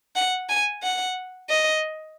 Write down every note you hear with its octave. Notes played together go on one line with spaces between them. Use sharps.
F#5
G#5
F#5
D#5